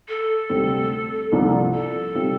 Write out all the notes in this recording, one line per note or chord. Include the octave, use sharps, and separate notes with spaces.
A4
D2 C3 G3 C4
C2 C3 F3 A#3 D4
A4
C3 G3 C4 F4